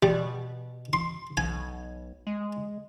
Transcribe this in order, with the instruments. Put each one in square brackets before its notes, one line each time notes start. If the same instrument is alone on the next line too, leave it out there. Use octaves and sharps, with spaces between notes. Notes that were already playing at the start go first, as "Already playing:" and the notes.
[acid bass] B2 [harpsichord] G3
[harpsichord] C6
[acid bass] B1 [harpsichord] G#5
[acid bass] G#3